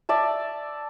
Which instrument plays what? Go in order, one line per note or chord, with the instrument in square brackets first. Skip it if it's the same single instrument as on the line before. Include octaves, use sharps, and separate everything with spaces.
[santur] D5 E5 A5